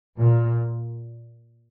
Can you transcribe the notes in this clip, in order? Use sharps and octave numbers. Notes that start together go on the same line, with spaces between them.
A#2